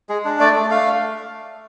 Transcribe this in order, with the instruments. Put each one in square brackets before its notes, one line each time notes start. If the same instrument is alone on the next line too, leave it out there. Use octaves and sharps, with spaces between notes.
[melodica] G#3 G#4
D4
A3 D5
A3
A3 F5